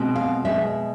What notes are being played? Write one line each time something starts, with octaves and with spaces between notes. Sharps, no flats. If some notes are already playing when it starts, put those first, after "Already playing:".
Already playing: B2 G#3 C4
F5
B2 G#3 E5